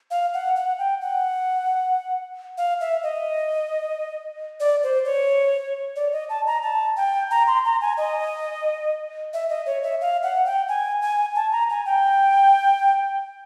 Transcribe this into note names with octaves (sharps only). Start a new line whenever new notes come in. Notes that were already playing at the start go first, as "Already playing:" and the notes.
F5
F#5
F#5
G5
F#5
F5
E5
D#5
D5
C5
C#5
D5
D#5
A5
A#5
A5
G5
A#5
C6
A#5
G#5
D#5
E5
D#5
C#5
E5
F5
F#5
G5
G#5
G#5
A5
A#5
G#5
G5